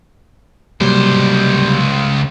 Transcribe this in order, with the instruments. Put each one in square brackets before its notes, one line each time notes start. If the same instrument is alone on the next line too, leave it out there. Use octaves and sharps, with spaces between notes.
[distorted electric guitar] C#2 C5 [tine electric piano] C3 F#3 A#3 [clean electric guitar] G3